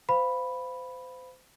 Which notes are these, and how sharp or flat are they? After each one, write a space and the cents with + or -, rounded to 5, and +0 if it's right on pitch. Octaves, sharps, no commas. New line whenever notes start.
C5 -30 F5 +0 B5 +0